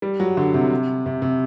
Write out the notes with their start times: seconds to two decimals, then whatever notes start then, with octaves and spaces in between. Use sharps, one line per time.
0.02 G3
0.20 F#3
0.37 D3
0.54 C3
1.06 C3
1.22 C3